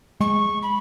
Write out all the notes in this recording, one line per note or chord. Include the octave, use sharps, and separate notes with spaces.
G#3 C#6
B5